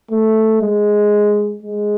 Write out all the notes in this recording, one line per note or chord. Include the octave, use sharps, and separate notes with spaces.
A3
G#3
G#3